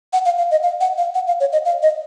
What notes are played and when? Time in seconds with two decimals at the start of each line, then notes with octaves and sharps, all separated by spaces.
0.13 F#5
0.25 F5
0.38 F5
0.51 D#5
0.63 F5
0.81 F#5
0.98 F5
1.14 F#5
1.27 F5
1.40 C#5
1.52 D#5
1.65 F5
1.82 D#5